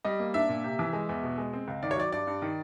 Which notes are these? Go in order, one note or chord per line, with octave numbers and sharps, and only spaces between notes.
G3 D#5
A#3
D4 E5
A#2
C3
E3
G#3
E2
B2
G#3
C4
C#2
D#3 D5
C#5
F#3 D5
G2 D5
G2
D#3